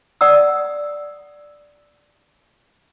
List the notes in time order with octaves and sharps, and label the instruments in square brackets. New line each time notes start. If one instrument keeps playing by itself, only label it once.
[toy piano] D5 F#5 D#6 E6